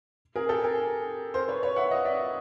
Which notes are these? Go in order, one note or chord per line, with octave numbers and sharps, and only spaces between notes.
G#4 A#4
G4 A4
G#4 A#4
A#4 C5
B4 C#5
B4 C#5
E5 F#5
D#5 F5
D5 E5